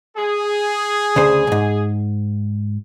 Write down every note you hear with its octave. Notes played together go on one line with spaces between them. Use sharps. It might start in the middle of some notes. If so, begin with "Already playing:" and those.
G#4
D2 C#3 C5
B1 G#2